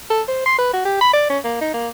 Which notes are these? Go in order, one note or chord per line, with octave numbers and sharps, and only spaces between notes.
A4
C5
C6
B4
F#4
G4
B5
D5
C#4
A#3
D#4
A#3